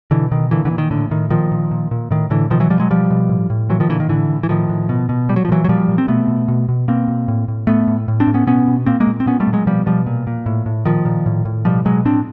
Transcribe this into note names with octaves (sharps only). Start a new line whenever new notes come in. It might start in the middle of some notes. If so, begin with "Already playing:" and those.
B2 D3 E3
B2 D#3
A#2 D3 E3
D3 E3
A#2
D#3
A2 D3
A2 D#3
A#2 D#3 F3
A#2
A#2
A#2
A2 D#3
A2 D3 E3
B2 D#3 F3
E3 F#3
B2 F3 G3
F#3 G#3
B2 F3 G3
B2
A2
A2
A#2 E3 F#3
D#3 F3
A#2 D3 E3
D#3
A2 D3 E3
A2
E3
A2 D#3 F3
A2
B2
B2
A#2 G3
F#3
F3
A#2 E3 F#3
F#3
A#2 F3 G3
A#2
C4
B2 A3 B3
B2
B2
B2
B2 A#3 C4
B2
A2
A2
A2 A3 B3
A2
A2
C4 D4
A2
B3 C#4
B2 B3 C#4
B2
A#2 A#3 C4
G#3 A#3
A#2
C4
A#2 B3 C#4
G3 A3
A#2
F#3 G#3
B2 F3 G3
B2 F3 G3
A#2
A#2
A2
A2
A#2 D#3 F3
A#2
A2
A2
B2 F3 G3
B2 F#3 G#3
A2 C4 D4